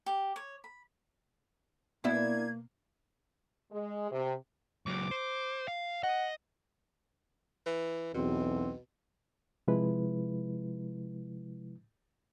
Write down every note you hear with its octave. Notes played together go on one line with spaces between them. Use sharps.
G4
C#5
B5
B2 A#3 B3 D4 E4 G#6
G#3
C3
C#2 F#3 D6
C5
F5
D#5 F#5
E3
B1 E2 B2 C4
C3 F3 G#3 E4 B4